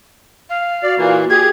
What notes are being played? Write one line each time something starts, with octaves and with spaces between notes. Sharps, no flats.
F5
F#4 D5
A#2 E3 A#3
G4 G#4 G#6